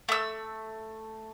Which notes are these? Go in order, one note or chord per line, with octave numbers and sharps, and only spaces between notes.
A3 E6